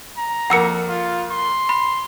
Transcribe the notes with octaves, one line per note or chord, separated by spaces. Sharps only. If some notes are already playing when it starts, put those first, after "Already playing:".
A#5
F2 A#3 F#5 E6 C#7
F4
C6
B5